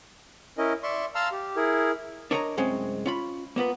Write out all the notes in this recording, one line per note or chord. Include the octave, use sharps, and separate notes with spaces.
C#4 E4 A#4 D#5
D5 E5 C6 C#6
F5 A5 A#5 C6 E6 F6
G4
E4 G#4 A#4
D4 A#4 C#5 D#5 G5 A#5
C2 F#2 G#3 C4 C#4
C#4 F4 B5
A#3 B3 F4 B4